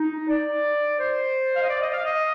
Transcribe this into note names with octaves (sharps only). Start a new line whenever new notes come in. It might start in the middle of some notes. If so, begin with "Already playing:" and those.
Already playing: D#4
D5
C5
F5
D#5
D5
D#5
F5
D#5